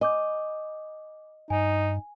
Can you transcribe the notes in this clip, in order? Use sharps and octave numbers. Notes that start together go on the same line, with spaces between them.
D#5 G#5 D6 G6
G2 D#4 G#5